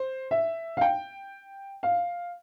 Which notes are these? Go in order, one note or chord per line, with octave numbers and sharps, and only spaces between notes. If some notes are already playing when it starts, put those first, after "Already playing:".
Already playing: C5
E5
F5
G5
F5